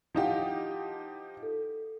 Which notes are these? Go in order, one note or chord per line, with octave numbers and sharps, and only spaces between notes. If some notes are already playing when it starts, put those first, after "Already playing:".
F3 D#4 E4 G4 F5 F#5
A4